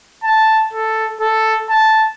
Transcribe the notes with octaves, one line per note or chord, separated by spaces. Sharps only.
A5
A4
A4
A5